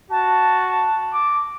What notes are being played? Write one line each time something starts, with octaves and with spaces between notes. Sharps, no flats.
F#4 A5
D6